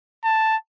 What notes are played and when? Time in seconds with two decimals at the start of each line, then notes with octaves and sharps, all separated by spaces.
0.24 A5